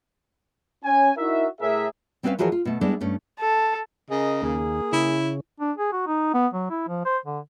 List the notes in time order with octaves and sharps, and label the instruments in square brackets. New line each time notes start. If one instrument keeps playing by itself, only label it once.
[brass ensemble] C#4 G#5
D#4 E4 F#4 A#4 E5
A2 G#4 A#4 E5
[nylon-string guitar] G3 C4 C#4 B4 E5 F5
E3 F3 F#4 G#4 A#4 C#5
F4
B2 A3
G3 G#3 B3 D4 E4 A4
G2 A3 C#4
[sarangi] A4
[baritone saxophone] C#3 [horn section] G#4 A#4 D#5
[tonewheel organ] D#2 [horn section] A#3 G#4
[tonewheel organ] C#3 [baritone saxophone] E4
[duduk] D4
G#4
F#4
D#4
B3
F#3
E4
F3
C5
D3